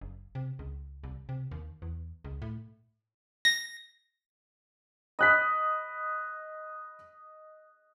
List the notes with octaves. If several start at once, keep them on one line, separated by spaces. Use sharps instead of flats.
F#1
C3
C#2
C2
C3
D#2
E2
C#2
A2
A#6
D#5 B5 F#6 B6